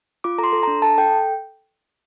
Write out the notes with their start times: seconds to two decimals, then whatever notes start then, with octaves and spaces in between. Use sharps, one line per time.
0.24 F4 D6
0.38 A4 A#5
0.44 C6
0.53 A4
0.63 D4 A#5
0.82 A4 A5
0.98 A4 G5